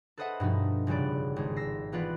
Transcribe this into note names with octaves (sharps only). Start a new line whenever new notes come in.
A4 B4 C5 D#5 E5 F#5
G2 B2 F3 D#4
F1 C#3 G3 B3 D5
G#1 G#3
E6 A#6 C7
E3 B3 F4 B4 D5